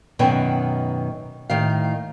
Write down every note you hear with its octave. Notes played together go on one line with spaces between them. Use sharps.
F#2 B2 D#3 B4 G5
A2 D#3 F5